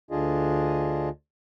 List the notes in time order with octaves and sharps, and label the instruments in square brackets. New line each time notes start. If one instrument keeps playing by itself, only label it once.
[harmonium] D2 D3 D4 F4 G#4 D#5